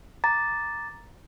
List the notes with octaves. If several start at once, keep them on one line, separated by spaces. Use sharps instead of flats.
A#5 D6 A6